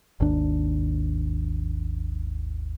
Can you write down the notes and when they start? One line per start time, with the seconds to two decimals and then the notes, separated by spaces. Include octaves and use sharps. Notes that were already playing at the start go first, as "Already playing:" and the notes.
0.20 G#1 D#2 D#3 D4